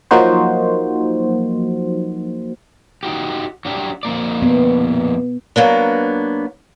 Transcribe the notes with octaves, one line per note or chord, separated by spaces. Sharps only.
F3 F#3 A#3 D#4 F#4 C5
D#4 F#4 G4
F#3 D4 G4
F2 A#3 D5
B3
F#3 A#3 B3 D4